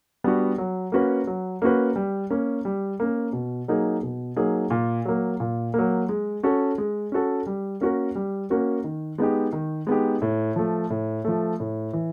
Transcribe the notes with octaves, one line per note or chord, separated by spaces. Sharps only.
G3 B3 D4 F#4
F#3
A#3 C#4 F#4 B4
F#3
A#3 C#4 F#4 B4
G3
A#3 C#4
G3
A#3 C#4
B2
F#3 A#3 D#4 G#4
B2
F#3 A#3 D#4 G#4
A#2
F#3 A#3
A#2
F#3 A#3
G#3
C#4 F#4 A4
G#3
C#4 F#4 A4
G3
A#3 C#4 F#4 A#4
G3
A#3 C#4 F#4 A#4
D#3
G#3 B3 D#4 G4
D#3
G#3 B3 D#4 G4
A2
F3 A3
A2
F3 A3
A2
E3